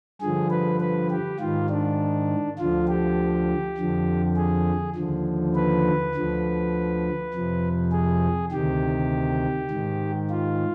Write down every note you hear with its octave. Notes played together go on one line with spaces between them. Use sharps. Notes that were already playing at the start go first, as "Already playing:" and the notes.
G2 D3 F3 G#4
B4
B4
G4
G#2 D#3 F4
D4
D2 D3 F3 F4
G4
F2 D3 F3
G#4
D#2 D3 F3
B4
D2 D3 F3
F2 C3 F3
G#4
D2 C3 D#3 G4
G#2 D#3
F4